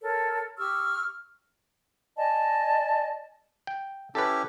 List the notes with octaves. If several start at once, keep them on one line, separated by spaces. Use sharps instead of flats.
A4 A#4 C#5
G4 C#6 E6 F6
D5 D#5 G#5 A5
G5
C#4 E4 G4 A4 B4